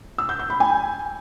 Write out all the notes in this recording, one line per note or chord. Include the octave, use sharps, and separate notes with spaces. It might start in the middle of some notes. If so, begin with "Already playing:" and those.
E6
G6
G6
B5
G#5